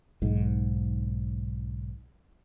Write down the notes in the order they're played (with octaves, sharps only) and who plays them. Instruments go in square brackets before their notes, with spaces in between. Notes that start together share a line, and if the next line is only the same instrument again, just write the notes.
[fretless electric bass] B1 G#2